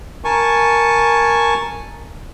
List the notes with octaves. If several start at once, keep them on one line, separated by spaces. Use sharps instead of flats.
A#4 G#5 A5 C#6